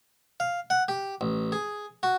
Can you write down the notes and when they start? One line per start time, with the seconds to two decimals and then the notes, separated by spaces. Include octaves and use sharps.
0.40 F5
0.70 F#5
0.88 G4
1.21 A1
1.52 G#4
2.03 F#4